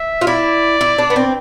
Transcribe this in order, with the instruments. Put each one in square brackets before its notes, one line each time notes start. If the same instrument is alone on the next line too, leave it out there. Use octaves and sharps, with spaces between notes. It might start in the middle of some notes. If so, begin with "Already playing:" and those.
Already playing: [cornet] E5
[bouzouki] F4
[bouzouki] E4 [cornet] D5
[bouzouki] E4
D4
B3
C4